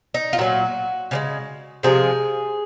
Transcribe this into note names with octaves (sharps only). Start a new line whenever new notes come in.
D#4
F4
A#2 F#3 F#4
C#3 F3 G#3
C3 F3 G#3 G#4